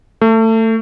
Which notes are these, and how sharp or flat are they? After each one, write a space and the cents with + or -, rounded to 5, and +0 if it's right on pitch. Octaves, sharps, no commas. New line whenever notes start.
A3 +25